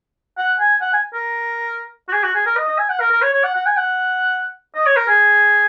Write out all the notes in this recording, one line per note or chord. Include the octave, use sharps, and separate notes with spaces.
F#5
G#5
F#5
G#5
A#4
F#4
G#4
F#4
G#4
A#4
D#5
D#5
G#5
F#5
A#4
A#4
C#5
C#5
F#5
F#5
G#5
F#5
D#5
C#5
A#4
G#4